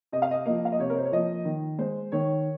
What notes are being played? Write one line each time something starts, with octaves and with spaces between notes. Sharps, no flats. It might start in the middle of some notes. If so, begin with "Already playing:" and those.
C3 D#5
F5
D#5
F3 A#3 D#5
F5
D#5
C3 C#5
A#4
C5
C#5
F3 A#3 D#5
D#3
G#3 C5
D#3 C#5